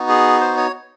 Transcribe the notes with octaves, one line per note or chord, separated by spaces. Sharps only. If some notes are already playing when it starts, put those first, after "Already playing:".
Already playing: B3 D#4 F#4
G#4
C5
C#5